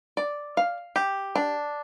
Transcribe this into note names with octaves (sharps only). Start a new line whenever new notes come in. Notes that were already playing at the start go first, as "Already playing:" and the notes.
D5
F5
G4
D4